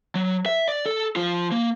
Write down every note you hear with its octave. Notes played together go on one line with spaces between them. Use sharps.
F#3
E5
D5
A4
F3 F4
A#3